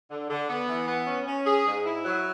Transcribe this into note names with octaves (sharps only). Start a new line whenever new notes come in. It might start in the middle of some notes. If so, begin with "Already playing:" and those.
D3
D3
B3
E3
B3
C#4
C#4
G#4
G#2
E4
F#3